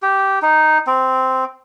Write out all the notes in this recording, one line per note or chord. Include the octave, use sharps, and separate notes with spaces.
G4
D#4
C4